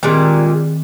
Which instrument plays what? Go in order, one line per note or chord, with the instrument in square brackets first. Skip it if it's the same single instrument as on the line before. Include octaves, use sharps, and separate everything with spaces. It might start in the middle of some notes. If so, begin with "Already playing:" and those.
[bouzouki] A#2 G3 G#3 [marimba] D#3 C4